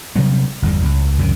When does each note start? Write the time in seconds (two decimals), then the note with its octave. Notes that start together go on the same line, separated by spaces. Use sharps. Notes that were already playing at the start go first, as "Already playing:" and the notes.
0.16 C3 F#3 G3 B3
0.62 G1 E2 G3
0.85 C#2
1.18 C#2 F#2 C3 D#3